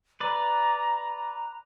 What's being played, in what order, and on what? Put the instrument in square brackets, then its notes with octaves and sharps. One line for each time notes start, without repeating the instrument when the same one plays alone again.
[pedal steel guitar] B4 D5 [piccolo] A#5